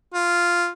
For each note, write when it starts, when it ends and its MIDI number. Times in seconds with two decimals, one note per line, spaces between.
0.14 0.69 65